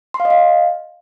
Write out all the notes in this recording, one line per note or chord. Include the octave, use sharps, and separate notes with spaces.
C6
F5
D#5
F5